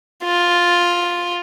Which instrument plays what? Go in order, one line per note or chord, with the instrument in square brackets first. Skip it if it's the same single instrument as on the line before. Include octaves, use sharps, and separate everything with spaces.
[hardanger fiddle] F4